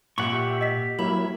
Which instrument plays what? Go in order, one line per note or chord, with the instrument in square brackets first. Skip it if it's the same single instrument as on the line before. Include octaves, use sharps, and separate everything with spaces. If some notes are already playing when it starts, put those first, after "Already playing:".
[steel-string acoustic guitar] A#2 [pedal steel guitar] G4 F#5 C#6 [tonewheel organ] E5
[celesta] D#5 B6
[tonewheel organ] F#3 A#3 E4 [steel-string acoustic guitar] E5 [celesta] B5 F#7